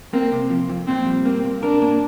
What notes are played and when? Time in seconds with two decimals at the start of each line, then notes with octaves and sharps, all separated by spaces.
0.14 A#3 C4
0.32 C3
0.50 F3
0.69 F2
0.87 A#2 C4
1.07 G3
1.25 A#3 C4
1.44 A#2
1.63 D4 A#4
1.82 A#3